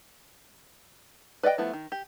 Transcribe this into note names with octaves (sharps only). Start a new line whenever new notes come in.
B4 D5 D#5 F#5 G5
F3 A3 B3 E4
D#3
G4